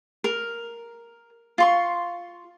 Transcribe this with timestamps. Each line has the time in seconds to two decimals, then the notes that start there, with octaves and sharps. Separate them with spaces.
0.24 A#4
1.58 F4 C6 C#6